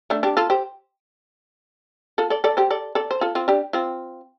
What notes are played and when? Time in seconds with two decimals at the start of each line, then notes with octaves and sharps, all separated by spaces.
0.10 A3 D4
0.23 D4 G4
0.37 F4 A4
0.50 G4 C5
2.18 F4 A4
2.30 A4 D5
2.44 A4 D5
2.57 G4 C5
2.70 A4 D5
2.95 A4 D5
3.11 C5
3.21 F4 A4
3.35 C4 F4
3.48 D4 G4
3.73 C4 F4